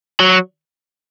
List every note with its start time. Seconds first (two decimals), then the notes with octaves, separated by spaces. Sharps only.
0.20 F#3